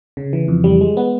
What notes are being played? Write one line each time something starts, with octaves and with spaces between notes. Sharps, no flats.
C#3
E3
F2
G3
G#3
B3